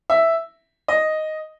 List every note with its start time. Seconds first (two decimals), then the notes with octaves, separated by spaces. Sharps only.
0.10 E5
0.88 D#5